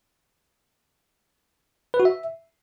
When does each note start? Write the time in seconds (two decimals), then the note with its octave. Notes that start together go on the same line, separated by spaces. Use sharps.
1.94 B4
2.00 F#4
2.05 E5